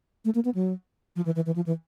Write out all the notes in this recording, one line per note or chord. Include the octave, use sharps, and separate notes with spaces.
A3
A#3
B3
F#3
F3
E3
E3
E3
F3
E3